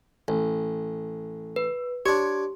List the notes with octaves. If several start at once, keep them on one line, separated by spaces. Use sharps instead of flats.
A1
B4
D4 G4 C#5